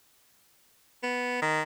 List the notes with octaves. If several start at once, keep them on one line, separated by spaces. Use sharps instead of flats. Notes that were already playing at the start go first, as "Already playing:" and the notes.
B3
D#3